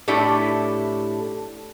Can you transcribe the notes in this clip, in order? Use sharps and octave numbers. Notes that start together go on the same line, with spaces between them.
A2 A3 D4 E4 G4 A4